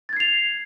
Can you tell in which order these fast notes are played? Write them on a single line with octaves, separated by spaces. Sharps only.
A6 G#6 C7 F7